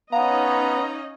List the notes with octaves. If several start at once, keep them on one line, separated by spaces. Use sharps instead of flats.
B3 C#4 D#4 D#5 F5 F#5 A#5